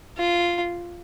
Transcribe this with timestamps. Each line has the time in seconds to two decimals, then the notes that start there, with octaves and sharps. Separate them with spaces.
0.18 F4